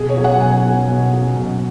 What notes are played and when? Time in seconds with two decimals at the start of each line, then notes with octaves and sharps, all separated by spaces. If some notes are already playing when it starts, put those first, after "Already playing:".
Already playing: B2 G#4
0.09 C#5
0.17 F#3
0.24 F#5
0.40 B2 G#5
0.65 F#3
0.88 B2
1.13 F#3
1.36 B2